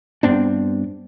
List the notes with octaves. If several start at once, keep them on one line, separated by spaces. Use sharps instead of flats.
G2 B3 C4 D4